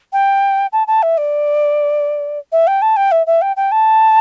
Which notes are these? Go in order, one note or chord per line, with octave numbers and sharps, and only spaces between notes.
G5
A5
A5
E5
D5
E5
G5
A5
G5
E5
E5
G5
G5
A5